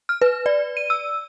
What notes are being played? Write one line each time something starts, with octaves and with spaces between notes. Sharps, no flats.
F6
B4
D5
D#7
E6